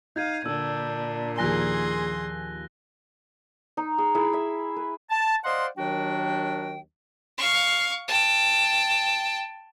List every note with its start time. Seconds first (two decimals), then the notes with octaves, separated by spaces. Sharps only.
0.16 D#4 F5 G6 G#6 D#7
0.46 A#2 D3 D4 E6
1.38 D#2 F3 G#4 G#5 C6 F#6 A#6 G7
3.77 D#4
3.98 G#4
4.15 E4 G#4 E5
4.33 E5
4.76 B4
5.11 A5
5.44 C5 D5 D#5 F5 F#5 C6
5.77 D#2 D#3 F#3 D4 F#4 G5
7.38 F5 C#6
8.08 G5 A5